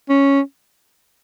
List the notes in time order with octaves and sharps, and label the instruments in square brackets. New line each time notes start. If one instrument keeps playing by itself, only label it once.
[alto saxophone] C#4